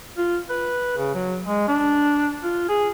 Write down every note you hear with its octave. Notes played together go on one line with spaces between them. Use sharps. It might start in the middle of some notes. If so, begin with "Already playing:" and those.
F4
B4
C#3
F#3
G#3
D4
F4
G#4